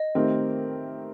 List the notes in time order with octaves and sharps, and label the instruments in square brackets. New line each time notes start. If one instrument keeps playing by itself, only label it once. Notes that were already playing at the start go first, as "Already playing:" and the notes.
Already playing: [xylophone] D#5
[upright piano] D#3 A3 C4 G4 A#4